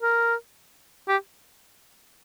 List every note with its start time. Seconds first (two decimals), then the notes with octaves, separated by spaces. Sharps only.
0.02 A#4
1.08 G4